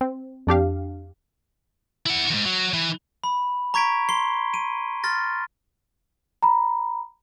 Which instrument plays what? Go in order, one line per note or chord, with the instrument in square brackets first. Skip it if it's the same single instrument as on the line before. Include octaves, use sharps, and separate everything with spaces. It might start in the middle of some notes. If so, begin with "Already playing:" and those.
[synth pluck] C4
F2 D4 G4 F5
[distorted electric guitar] E4 F#5
E2 G#2
F#3
E3
[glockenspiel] B5
A#5 C#6 G#6 B6 D7
C6 C7 G7
D7 D#7
C6 F6 A6 A#6
[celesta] A#5 B5